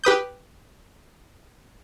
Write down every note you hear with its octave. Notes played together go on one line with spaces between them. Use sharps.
G4 B4 D#6 G6